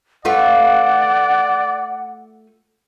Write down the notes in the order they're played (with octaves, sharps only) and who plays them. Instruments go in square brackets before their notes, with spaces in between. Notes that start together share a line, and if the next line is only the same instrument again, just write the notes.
[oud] A3 F4 B4 [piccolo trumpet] D5 [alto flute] F#5